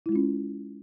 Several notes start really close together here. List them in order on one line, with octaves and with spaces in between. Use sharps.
E4 G#3 F4 C#4